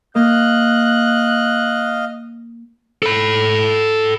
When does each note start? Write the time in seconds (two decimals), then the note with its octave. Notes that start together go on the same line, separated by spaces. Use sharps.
0.15 A#3 D#5 F5 F#6
3.03 A4 B5